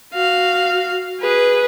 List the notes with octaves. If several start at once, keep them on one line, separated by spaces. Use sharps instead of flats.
F#4 F5
G#4 B4